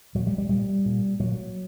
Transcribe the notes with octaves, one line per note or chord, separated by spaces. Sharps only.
A#2 F#3
G3
G3
A#2 G3
A#2
A#2 F#3